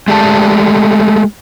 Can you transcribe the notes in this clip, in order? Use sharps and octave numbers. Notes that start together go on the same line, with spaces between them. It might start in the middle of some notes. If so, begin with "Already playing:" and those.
G#3 A3 G4 D5 A5